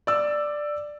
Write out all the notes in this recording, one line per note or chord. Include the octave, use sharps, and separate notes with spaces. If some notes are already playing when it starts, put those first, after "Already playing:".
D5 E6